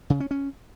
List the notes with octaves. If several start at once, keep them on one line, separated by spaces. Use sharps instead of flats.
C#3
C#4
C#4